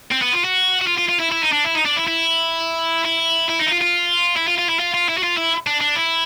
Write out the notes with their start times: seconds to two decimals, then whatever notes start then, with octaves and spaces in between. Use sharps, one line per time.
0.12 C4
0.22 B3
0.33 F4
0.44 F#4
0.81 F#4
0.87 F4
0.98 F4
1.09 F4
1.20 E4
1.32 E4
1.42 D#4
1.52 D4
1.64 E4
1.75 D#4
1.85 D4
1.96 E4
2.07 E4
3.05 E4
3.49 E4
3.60 D#4
3.66 E4
3.71 F4
3.81 F4
4.36 E4
4.47 F4
4.58 F4
4.69 E4
4.79 F4
4.94 F4
5.09 E4
5.18 F#4
5.23 F4
5.37 E4
5.67 D4
5.81 D4
5.95 E4